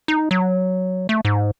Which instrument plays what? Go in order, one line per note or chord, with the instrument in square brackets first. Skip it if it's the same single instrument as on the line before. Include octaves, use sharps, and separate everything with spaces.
[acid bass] D#4
F#3
A3
G#2